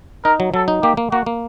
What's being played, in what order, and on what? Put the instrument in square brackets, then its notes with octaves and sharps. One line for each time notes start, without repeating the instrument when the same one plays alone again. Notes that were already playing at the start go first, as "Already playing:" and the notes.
[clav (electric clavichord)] D#4 [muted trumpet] A#4
[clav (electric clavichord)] F#3
[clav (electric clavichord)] F#3 [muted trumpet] A4
[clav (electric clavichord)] D#4
[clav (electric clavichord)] A#3 [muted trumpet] G4
[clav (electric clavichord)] A#3
[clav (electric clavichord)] A#3 [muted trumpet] F#4
[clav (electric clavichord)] A#3